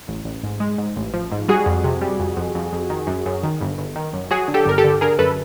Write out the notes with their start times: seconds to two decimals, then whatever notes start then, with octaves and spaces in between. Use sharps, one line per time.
0.08 A1
0.25 A1
0.43 G#2
0.60 G#3
0.78 G#2
0.96 A1
1.14 F3
1.32 G#2
1.48 G3 F#4 G#4
1.66 F2
1.84 C3
2.01 G3
2.19 F2
2.37 F2
2.55 F2
2.73 F2
2.90 D#3
3.07 F#2
3.26 F#2
3.43 D#3
3.61 G1
3.78 G1
3.96 D#3
4.13 F#2
4.31 F#3 F#4 G#4
4.48 D3
4.54 G4 A4
4.66 G1 A#4
4.78 G4 A4
4.84 D3
5.01 D3 G#4 A#4
5.19 F#2 A4 B4